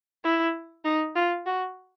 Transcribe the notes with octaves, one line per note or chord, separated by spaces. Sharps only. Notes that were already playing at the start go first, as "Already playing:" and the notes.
E4
D#4
F4
F#4